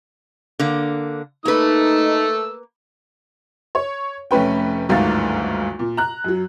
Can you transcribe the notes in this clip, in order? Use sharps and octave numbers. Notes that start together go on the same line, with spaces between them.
D3 A#3
A3 A#3 D#4 B4 E6
C#5
F1 A3 C#4 B4 G5
G1 D2 G#2 D#3 F5 A6
A#2
A#5 F#6
F#2 F#3